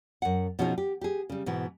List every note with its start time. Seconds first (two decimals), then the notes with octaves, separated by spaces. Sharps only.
0.22 F#2 F#5
0.59 B2 F3 C#4 D#4 F#4 G#4
0.78 G4
1.01 G4 G#4
1.30 C#3 G3
1.46 G#2 B2 E3